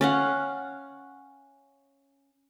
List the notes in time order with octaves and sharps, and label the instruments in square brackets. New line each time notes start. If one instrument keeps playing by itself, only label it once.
[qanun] C#4 F5 F#5